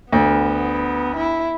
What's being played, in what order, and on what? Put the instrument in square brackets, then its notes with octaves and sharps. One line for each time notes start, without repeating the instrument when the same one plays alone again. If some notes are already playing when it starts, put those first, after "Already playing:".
[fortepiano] D2 [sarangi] B3
[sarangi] E4